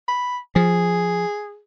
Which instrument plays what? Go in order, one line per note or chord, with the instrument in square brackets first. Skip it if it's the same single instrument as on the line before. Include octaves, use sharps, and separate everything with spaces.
[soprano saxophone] B5
[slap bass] F3 [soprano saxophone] G#4